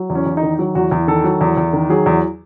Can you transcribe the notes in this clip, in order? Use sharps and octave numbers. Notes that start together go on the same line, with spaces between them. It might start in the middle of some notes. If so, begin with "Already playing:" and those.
Already playing: F#3
E2
C#4
E2
D#4
D#3
F#3
E2 F#4
E2
D#3 A4
F#3
E2
E2
D#3
F#3 G#4
E2